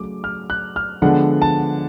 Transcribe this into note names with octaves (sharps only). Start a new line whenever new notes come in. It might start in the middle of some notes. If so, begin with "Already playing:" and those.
Already playing: C#3 F#3 A3 D6
F6
F#6
F6
D3 F3 G#3 B3 D4 F#5
A5